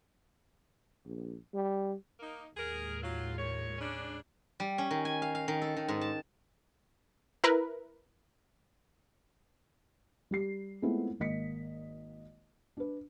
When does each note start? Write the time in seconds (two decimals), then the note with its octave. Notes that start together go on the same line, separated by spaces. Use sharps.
1.06 A#1
1.54 G3
2.20 A#3 D#4
2.55 D#2 A2 G#3 G#4 A#4
3.01 F#3 F4
3.36 A#2 C#5
3.78 C#3 C#4 D4
4.60 G3
4.78 C#4
4.91 D#3
5.05 G#5
5.22 F5
5.35 F5
5.48 D#3
5.62 A4
5.76 D#3
5.88 G#2
6.01 A5
7.44 E4 A#4 B4
10.31 G3 G4 C7
10.82 G#3 A3 B3 C4 E4 F4
11.20 G#1 A#3 D#5 B6 C#7
12.77 D4 B4